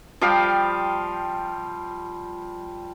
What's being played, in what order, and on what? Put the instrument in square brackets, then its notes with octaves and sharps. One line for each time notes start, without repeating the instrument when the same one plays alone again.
[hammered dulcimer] F3 G3 F5 G5